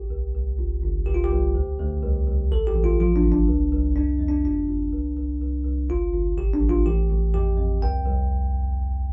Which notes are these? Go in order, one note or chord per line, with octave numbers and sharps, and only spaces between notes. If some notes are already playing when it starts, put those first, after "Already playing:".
Already playing: A1 G4
C2
C2
G1
G1
C2 G4
F4
G4
C2
D2
D2
C2
C2
A1 A4
G4
A1
F4
F3 F4
D4
G1
D4
C2
C2
F2 D4
F2
D4
G1 D4
G1
C2
C2
C2
C2
G1 F4
G1
A1 G4
D4
A1
F4
A1 G4
A1
F2 G4
F2
C2 G5
C2